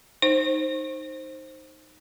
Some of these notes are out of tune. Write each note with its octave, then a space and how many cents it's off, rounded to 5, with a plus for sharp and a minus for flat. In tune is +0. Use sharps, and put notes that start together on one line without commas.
D#4 +0 C5 +15